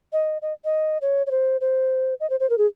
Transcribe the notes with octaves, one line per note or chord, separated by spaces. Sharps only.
D#5
D#5
D#5
C#5
C#5
C5
C5
D#5
C5
C5
A#4
G#4